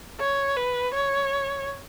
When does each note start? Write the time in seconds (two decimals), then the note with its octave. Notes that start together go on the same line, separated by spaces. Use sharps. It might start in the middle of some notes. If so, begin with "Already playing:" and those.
0.20 C#5
0.57 B4
0.94 C#5